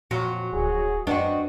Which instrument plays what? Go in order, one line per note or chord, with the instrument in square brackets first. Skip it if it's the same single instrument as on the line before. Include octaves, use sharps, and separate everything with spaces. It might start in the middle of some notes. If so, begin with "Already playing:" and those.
[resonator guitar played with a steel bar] F2 [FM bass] A#2 [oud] F#3
[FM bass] D1 [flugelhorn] G#4
[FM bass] F#2 [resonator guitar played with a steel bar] B3 C4 F#4 [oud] D4 [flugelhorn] D#5